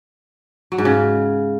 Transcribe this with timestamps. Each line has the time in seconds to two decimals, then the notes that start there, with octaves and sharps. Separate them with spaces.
0.72 F#3
0.78 G#2
0.85 C#3